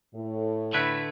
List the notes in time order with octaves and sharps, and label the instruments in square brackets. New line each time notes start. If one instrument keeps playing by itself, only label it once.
[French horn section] A2
[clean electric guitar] D3 A3 E4 B4